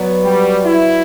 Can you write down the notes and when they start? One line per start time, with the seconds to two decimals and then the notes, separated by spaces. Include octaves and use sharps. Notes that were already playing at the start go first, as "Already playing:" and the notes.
Already playing: F#3 B3 F#4 B4 D5
0.24 G3
0.65 E4